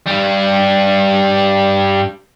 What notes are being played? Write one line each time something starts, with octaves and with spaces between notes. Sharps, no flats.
G2 G3